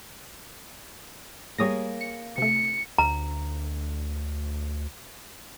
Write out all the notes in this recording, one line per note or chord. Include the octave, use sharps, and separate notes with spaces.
G3 A#3 G#4 C#5 D#6 A#6
C#7
C3 A3 C#7
D2 A#5